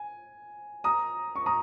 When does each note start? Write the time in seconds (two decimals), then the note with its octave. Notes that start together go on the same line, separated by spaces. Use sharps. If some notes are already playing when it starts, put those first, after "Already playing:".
Already playing: G#5
0.84 A#5 D#6
1.36 C#6
1.46 A#5 D#6